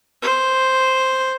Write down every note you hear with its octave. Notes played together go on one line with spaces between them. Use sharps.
C5